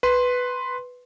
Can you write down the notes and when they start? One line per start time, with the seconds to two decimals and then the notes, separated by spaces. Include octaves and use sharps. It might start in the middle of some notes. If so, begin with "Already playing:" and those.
0.03 B4 C6